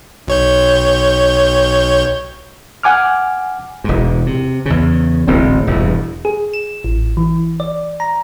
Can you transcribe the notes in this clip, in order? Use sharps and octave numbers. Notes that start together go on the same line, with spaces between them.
B1 C#5 G6
F#5 G#5 D6 F6
E1 G#2
C3
E2 C#3
D1 A1 G#2 C4
E1 E2 G2
G#4
E7
A1
E3
D5
A#5